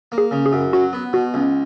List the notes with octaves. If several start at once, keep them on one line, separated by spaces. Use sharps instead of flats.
A#3
G#4
C#3
G#4
F#2
F#3 F#4
B3
B2 F#4
C#2